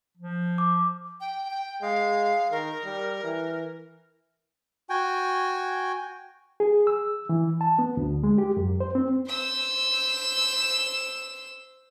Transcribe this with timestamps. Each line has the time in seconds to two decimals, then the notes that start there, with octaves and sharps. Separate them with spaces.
0.17 F3
0.58 D6
1.20 G5
1.51 G5
1.82 G#3 F5
2.51 D#3 A#4
2.85 G3
3.23 E3
4.90 F#4 G5 G#5
6.60 G#4
6.87 E6
7.29 E3
7.61 A5
7.79 B3
7.97 D2
8.23 G#3
8.38 G4
8.57 F#2
8.80 C5
8.95 C4
9.27 C5 E6